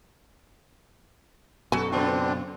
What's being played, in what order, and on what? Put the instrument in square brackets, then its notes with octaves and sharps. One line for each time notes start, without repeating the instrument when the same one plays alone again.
[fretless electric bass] F#2 B2 [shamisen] F#3 G3 G#5 [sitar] F#4 A4
[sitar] C#3 B3 F4 [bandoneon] C4 D4